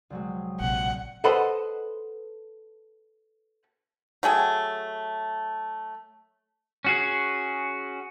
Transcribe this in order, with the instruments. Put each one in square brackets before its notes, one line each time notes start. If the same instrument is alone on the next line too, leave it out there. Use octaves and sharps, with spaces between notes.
[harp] C2 F#3 G#3
[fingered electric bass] A#1 C3 [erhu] F#5
[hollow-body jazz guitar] A4 B4 C5 D#5 F#5 B5
[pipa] F#3 A3 G#4 G5
[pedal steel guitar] C#4 F#4 G#4